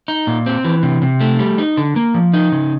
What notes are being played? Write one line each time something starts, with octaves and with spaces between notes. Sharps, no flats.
D#4
A#2
C4
E3
C3
C3
A3
G3
D#4
D3
A#3
F3
D#4
C#3